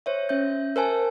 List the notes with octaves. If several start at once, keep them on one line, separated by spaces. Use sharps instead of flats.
C5 C#5 E5
C#4 E5 G6
A#4 C5 G#5 A5